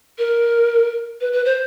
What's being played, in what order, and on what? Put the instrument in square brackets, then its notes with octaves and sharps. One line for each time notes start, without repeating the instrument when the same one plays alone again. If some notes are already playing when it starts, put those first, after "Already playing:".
[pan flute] A#4
B4
B4
C5